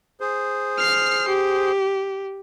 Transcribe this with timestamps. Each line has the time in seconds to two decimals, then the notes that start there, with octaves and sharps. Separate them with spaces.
0.20 G#4 C5
0.78 F6 C7
1.28 G4